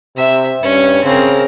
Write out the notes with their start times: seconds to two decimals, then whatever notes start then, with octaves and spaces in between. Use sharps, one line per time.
0.17 C3 E5
0.63 G2 C#4
1.04 C#3 C4 A#4